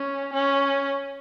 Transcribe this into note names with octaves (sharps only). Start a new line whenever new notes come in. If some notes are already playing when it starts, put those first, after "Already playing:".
Already playing: C#4
C#4